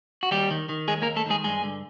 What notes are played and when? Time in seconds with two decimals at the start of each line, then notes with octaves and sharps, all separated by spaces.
0.23 F#4
0.31 D#2 G3 G4
0.50 D#3
0.69 D#3
0.88 D#2 G#3 G#4
1.02 A#3 A#4
1.07 D#2
1.16 A3 A4
1.26 D#3 G#3 G#4
1.44 G2 G#3 G#4
1.64 D3